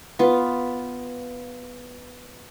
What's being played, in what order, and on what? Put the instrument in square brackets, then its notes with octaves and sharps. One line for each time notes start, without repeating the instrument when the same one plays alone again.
[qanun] B3 F4